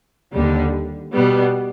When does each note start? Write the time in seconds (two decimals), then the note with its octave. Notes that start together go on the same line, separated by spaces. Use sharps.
0.33 D#2 D3 G3
1.14 B2 G3 B3